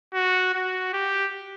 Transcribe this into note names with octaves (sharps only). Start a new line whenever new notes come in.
F#4
F#4
G4